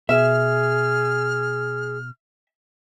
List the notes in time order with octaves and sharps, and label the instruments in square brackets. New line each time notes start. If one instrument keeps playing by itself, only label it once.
[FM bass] B2 [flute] G#4 [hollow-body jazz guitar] E5 [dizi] F6